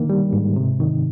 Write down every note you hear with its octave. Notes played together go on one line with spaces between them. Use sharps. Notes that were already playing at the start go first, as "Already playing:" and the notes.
Already playing: D3 D#3 A#3
G3
G#2
C3
D#3